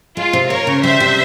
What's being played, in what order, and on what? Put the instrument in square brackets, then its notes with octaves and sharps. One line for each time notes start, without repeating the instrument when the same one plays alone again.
[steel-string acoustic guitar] G#3 [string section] F4
[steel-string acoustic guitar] C3
[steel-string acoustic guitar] A#3 [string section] A#4 C#5
[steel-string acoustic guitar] C#3
[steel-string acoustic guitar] G3 [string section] C5 E5
[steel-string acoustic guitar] C3